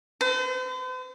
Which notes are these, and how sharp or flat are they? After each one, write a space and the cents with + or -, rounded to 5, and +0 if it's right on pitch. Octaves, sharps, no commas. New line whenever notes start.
C5 -45